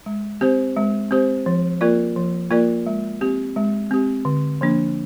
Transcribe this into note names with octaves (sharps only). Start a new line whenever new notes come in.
G#3
C4 G4 C5
G#3
C4 G4 C5
F3
A#3 F4 A#4 D5
F3
A#3 F4 A#4 D5
G#3
C4 G4
G#3
C4 G4
D3
F3 A#3 D4